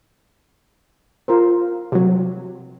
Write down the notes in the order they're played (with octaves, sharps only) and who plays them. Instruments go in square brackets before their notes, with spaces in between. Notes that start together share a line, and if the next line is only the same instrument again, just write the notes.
[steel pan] F4 A#4 C5
[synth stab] C3 F#3 [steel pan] C4